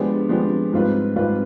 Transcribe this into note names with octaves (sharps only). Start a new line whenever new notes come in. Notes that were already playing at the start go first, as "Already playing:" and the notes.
Already playing: F3 G#3 B3 D4 G4
F3 G#3 B3 D4 G4
G#2 G3 C4 F4 B4
G#2 G3 C4 F4 B4